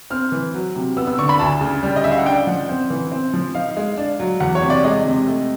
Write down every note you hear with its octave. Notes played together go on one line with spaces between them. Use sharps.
C4 F6
E3
F#3
C3
B3 E6
E6
D3 C#6
B5
D2 A5
C#3
G3
D#5
C#3 E5
F5
F#5
D4 G5
F3 F#5
C4
E3
C4
F3
D#4 F5
G#3
D4
F#3
E2 F#5
C#5
C3
D5
G#3 D#5
C3
A3